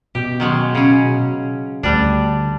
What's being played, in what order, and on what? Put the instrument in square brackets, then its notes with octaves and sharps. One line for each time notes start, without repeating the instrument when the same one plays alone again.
[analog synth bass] B2 [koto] G4
[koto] D#3 F#3 G#3
C#3 C#4
[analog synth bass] D2 [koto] G3 D4